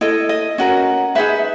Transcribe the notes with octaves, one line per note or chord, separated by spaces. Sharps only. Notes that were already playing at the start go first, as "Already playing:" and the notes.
E4 A4 D#5
D#5
C#4 F#4 A#4
D#4 G#4 B4 E5